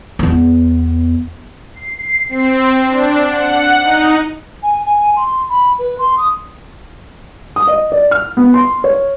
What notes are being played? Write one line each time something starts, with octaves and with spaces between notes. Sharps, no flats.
E2 B3
C7
C4
D4
F#5
D#4
G#5
G#5
C6
B5
B4
C6
D#6
D#6
D#5
D5
F6
B3
C6
C#5